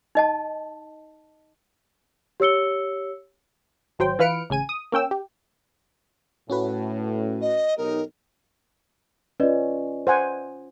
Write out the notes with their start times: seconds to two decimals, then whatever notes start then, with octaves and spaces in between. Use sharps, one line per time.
0.15 D#4 D#5 A5
2.40 G4 C#5 E6 C#7 G7
3.99 G#1 F#3 C5 G5
4.19 E3 F4 B4 F6 C#7 D7
4.50 A1 C#3 G#5 D#7
4.69 D#6
4.92 A#3 C#4 G5 E6
5.11 G4
6.50 A2 C#4 F#4 B4
7.41 D#5
7.78 B1 D#4 G4 A#4
9.40 C#4 F4 B4 D5 D#5
10.07 C5 F#5 G#5